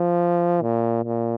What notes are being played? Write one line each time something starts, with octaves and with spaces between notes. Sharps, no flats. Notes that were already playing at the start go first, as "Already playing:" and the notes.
Already playing: F3
A#2
A#2